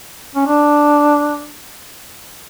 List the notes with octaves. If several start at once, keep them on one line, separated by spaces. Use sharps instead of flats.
C#4
D4